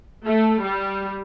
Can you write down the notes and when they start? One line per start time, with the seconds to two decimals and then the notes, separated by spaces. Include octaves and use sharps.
0.25 A3
0.62 G3